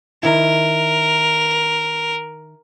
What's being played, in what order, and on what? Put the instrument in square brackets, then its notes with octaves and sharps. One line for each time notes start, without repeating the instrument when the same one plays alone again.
[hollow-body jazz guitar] D#3 E4 [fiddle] A#4